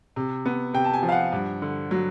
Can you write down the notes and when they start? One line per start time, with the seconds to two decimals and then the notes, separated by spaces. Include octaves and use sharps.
0.16 C3
0.45 B3
0.74 C3 G5
0.84 A5
0.93 G#5
1.03 F3
1.09 F5
1.12 F#5
1.32 G2
1.62 D3
1.91 F#3